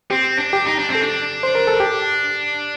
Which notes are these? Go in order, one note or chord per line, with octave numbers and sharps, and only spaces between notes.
C4 G4
D4
G4
D#4
D4
C4 A4
D4
C5
A#4
A4
G4